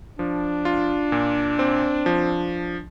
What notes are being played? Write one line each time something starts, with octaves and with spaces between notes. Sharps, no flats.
F3 D4
F4
A#2
C4
F3